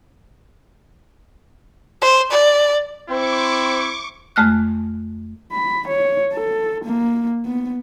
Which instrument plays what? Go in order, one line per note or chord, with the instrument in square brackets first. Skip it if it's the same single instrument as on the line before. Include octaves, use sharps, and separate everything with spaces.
[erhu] C5
D5
[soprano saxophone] C4 [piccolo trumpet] E4 [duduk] C5 [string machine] C#6 D6
[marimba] F2 G#3 A3 F6 F#6
[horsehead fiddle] B5
C#5
A4
A#3
B3